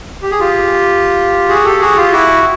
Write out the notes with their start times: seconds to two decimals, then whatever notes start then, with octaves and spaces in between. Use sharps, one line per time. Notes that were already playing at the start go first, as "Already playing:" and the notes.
0.22 G4
0.31 G#4
0.40 F4 G4
1.48 F#4 G#4
1.65 G4 A4
1.81 F#4 G#4
1.96 F4 G4
2.12 E4 F#4